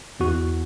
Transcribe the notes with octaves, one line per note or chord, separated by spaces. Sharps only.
E2 F#4